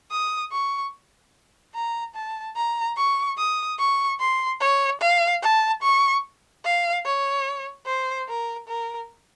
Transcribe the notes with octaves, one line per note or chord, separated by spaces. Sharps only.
D#6
C#6
A#5
A5
A#5
C#6
D#6
C#6
C6
C#5
F5
A5
C#6
F5
C#5
C5
A#4
A#4